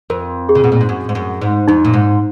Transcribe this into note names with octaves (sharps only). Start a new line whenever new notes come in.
F2 A#4
G#4
C#3
B2
A#2
G#2
F#2
G#2
F#2
G#2
F2 D#4
A#2
G#2